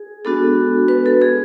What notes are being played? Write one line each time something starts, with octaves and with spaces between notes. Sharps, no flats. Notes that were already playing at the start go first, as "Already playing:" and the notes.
Already playing: G#4
G#3 B3 D4 F#4 A4
B4
A4
G#4